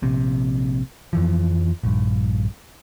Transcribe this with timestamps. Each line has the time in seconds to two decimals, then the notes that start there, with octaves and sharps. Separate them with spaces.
0.02 A#1 C3
1.13 F2 E3 F3
1.83 A#1 G2